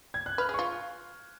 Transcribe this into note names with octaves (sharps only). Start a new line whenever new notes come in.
G#6
F#6
B4 F6
G#4
F4 C#6